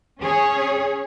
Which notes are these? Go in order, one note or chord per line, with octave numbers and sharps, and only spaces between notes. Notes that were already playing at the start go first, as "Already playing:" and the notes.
C#4 G#4 C#5